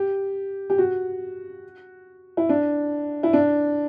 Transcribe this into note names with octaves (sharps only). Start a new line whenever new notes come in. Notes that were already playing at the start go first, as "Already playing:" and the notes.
Already playing: G4
G4
F#4
E4
D4
E4
D4